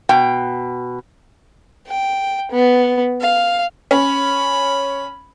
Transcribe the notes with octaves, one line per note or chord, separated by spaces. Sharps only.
B2 G5
G5
B3
F5
C#4 B5